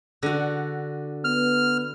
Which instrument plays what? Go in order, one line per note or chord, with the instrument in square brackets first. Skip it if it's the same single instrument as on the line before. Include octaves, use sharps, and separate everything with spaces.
[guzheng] D3 F#4
[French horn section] B3 [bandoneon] F6